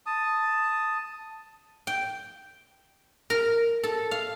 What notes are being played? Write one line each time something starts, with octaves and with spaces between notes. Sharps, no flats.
A5 D#6
G5
A#4
A4
F5